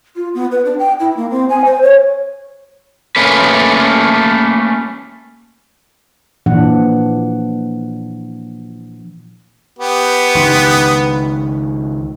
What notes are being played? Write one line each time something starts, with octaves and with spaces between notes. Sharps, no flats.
F4
B3
B4
D4
G5
E4
A#3
C4
G#5
C5
C#5
A3 A#3 C#4 B4
A#2 E3 F3 D4 F#5
B3 G4
C#2 D#3